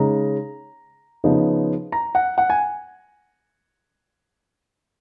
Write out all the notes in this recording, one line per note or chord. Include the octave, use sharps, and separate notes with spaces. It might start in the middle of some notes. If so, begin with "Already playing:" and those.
Already playing: C#3 G#3 D#4 A#5
C#3 F3 B3 D#4
A#5
F#5
F#5
G#5